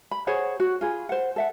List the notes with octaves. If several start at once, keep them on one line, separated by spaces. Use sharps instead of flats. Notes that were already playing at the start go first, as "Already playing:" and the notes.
B5
G#4 C5 C#5 F#5
F#4
F4 G#4 B5
C5 F#5
A4 E5 F#5